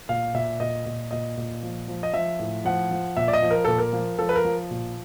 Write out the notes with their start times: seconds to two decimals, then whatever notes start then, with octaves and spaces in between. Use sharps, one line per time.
0.09 A#2 F5
0.34 A#2 E5
0.60 A#2 D#5
0.86 A#2
1.11 A#2 D#5
1.37 A#2
1.63 F3
1.88 F3
2.03 D#5
2.13 F3 E5
2.39 A2
2.65 F3 F#5
2.91 F3
3.17 A#2 E5
3.28 D5
3.33 D#5
3.42 F3
3.51 A#4
3.65 A#2 A4
3.78 A#4
3.93 F3
4.18 F3 A4
4.29 B4
4.36 A#4
4.45 F3
4.71 A#2